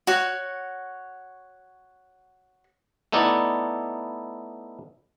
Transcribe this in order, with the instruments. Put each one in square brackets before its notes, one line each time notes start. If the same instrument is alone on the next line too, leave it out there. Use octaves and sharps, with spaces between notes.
[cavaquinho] F#4 C#5
[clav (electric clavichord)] A3 B3 D#4 E4 D5